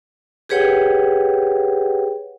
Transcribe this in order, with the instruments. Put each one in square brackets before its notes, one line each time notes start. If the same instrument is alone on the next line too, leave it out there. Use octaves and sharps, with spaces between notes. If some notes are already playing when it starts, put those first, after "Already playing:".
[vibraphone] G4 G#4 B4 C#5 F#5 G5